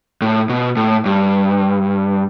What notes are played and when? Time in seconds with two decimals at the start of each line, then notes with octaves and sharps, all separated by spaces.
0.22 A2
0.49 B2
0.77 A2
1.06 G2